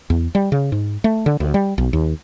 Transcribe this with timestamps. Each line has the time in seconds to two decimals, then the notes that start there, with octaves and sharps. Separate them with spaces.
0.10 E2
0.35 G3
0.52 C#3
0.72 G#2
1.04 A3
1.26 D3
1.40 D2
1.54 G3
1.78 B1
1.93 D#2